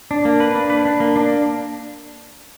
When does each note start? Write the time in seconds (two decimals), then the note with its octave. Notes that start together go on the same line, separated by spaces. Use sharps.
0.11 D4
0.25 A#3
0.40 B4
0.55 D4
0.70 B4
0.85 D4
1.00 A#3
1.16 D4